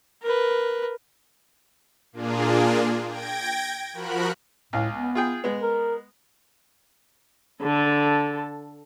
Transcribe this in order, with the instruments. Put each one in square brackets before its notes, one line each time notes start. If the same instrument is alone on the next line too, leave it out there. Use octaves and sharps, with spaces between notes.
[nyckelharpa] A#4 B4
[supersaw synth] A#2 A#3 D4 F4 G#4
G5 G#6 A#6 D7
F3 F#4 A#4 B5 F#6
[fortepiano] C#2 F5 [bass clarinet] A2
[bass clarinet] B3
[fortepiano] F4 G#4 G5
G#3 B3
[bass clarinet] A#4
[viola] D3 A4